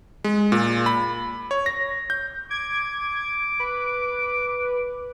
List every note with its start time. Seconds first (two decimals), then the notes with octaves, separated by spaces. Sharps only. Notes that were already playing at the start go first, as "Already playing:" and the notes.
0.24 G#3
0.52 A#2
0.86 B5
1.51 C#5
1.66 A#6
2.10 G6
2.50 D6 G#6
3.60 B4